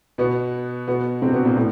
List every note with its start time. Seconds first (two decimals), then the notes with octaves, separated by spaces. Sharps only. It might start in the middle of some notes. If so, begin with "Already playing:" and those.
0.18 B2 B3
0.88 B2 B3
1.22 C3 C4
1.33 B2 B3
1.45 A#2 A#3
1.57 A2